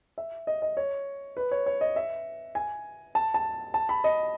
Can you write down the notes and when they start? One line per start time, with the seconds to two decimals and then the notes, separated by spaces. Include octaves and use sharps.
0.18 E5
0.47 D#5
0.62 D#5
0.77 C#5
1.37 B4
1.52 C#5
1.66 C#5
1.81 D#5
1.96 E5
2.55 G#5
3.15 A5
3.34 A5
3.74 A5
3.89 B5
4.04 D#5